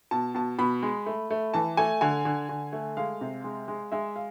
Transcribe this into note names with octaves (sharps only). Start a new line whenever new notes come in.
B2 A5
B2 A5
B2 B5
G#3
A3
A3
E3 A5
A3 G#5
D3 G#5
D3
D3
A3
G#3 F5
C3
G#3
G#3
G#3 E5
F5